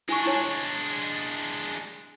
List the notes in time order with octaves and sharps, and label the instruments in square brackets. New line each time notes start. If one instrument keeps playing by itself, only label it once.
[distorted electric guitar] G#3 D4 [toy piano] E4 G#5 C#6
[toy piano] E4 C#5 G#5